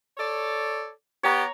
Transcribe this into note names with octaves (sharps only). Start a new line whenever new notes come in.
A4 C#5 D5
B3 G4 C#5 A#5